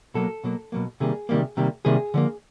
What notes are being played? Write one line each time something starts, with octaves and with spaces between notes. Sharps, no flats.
B2 F#3 A#3 A4
B2 F#3 A#3
B2 F#3 A#3
C3 D#3 G3 A#3 G#4
C3 D#3 G3 A#3
C3 D#3 G3 A#3
C3 D#3 G3 A#3 G#4
D3 F3 A#3